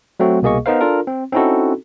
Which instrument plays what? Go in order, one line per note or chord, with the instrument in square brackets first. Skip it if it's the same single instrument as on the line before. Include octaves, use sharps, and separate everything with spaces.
[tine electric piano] F#3 A3 C4 F#4
C2 B2 A#3 G#4 D#5 C#6
B3 D#4 A#4 C5 F5
D4 F4 A4 A#4
C4
C4 C#4 D#4 E4 F#4 A4